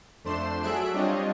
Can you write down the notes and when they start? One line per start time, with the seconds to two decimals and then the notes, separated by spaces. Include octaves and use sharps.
0.24 F2 A3 D4 C5 C6 E7
0.63 F#3 G#4 A4 E5 F#6 D7
0.92 G3 C4 D4 F4 C#5 D#5